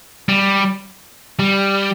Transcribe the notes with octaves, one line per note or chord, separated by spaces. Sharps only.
G3
G3